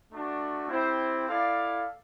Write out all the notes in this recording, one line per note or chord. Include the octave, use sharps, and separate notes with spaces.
A3 D4 F#4
C4 E4 G4 C5
E4 A4 D5 F5